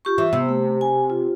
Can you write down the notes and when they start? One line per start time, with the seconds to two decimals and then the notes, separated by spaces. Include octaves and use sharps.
0.05 F4 G4 C#6
0.18 E3 E5
0.33 C3 B3 E6
0.49 A3
0.81 G#5
1.10 F4